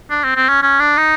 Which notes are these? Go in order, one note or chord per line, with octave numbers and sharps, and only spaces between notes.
D4
C4
C4
C#4
C#4
D4
D#4